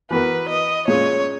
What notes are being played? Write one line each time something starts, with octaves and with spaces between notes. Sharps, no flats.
E3 B3 F#4 A#4 B4
D#5
A#2 G#3 C#4 C#5